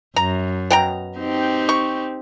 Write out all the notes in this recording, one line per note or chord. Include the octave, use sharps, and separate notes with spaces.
F#2 A#5
B2 G5 A#5
C4 D#4 G4
C#6